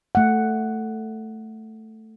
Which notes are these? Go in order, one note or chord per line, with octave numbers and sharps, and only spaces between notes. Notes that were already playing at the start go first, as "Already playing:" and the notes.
A3 F#5